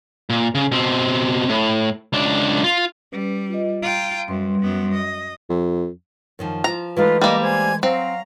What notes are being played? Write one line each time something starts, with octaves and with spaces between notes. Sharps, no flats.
A#2
C#3
B2 C4
A2
C#2 D4
F4
G3 C#4 B4
F4 B4 D#5
F4 G5 A#5
F#2 G3 B4 C6
F#2 B3
D#5
F2
F#2 D#3 F3
F3 F4 A#5
E3 G#3 A3 D#4 F4 B4
G3 A#3 D#5 D6
C5 G#5 G#6
F#3 C4 F5 A#5